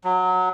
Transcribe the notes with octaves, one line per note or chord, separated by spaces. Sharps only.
F#3